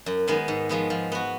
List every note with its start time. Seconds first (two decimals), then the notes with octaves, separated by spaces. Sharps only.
0.06 F#2
0.27 D#3 G#3 B3
0.48 G#2
0.69 F3 G#3 B3
0.90 F3
1.12 B3 F#4